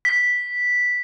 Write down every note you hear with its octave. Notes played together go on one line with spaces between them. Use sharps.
B6